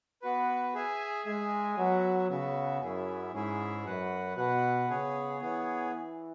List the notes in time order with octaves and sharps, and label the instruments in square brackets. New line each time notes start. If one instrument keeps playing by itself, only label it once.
[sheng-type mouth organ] B3 F#4 B4
G#4 E5 G#5
[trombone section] G#3 [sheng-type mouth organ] G#4 E5 G#5
[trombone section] F#3 [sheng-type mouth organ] B3 F#4 E5
[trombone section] C#3 [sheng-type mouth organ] B3 F#4 E5
[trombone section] F#2 [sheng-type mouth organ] C#4 E4 G#4 E5
[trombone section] G#2 [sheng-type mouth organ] C#4 E4 G#4 E5
[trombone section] F#2 [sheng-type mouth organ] F#4 B4 F#5
[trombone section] B2 [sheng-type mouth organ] F#4 B4 F#5
[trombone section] C#3 [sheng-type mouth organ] B3 G#4 C#5
[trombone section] E3 [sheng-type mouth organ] B3 G#4 C#5